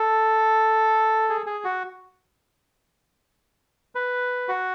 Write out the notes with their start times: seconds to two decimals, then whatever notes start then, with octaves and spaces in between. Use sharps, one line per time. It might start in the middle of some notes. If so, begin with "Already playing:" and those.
Already playing: A4
1.29 G#4
1.46 G#4
1.64 F#4
3.95 B4
4.48 F#4